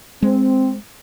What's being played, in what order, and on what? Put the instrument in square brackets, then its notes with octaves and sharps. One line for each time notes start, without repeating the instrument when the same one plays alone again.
[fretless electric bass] G#3 [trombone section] C4